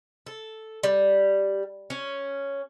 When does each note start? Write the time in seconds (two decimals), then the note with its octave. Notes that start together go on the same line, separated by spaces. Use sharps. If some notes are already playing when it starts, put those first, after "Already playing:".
0.27 A4
0.83 G3
1.90 C#4